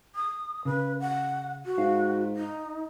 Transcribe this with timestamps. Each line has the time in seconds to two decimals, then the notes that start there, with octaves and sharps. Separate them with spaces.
0.16 D#6
0.65 C#3 B4
1.00 F#5
1.66 F#4
1.78 G#2 F5
2.36 D#4